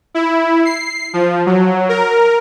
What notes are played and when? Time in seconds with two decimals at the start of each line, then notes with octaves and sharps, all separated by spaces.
0.14 E4
0.65 C7
1.13 F3
1.46 F#3
1.89 A#4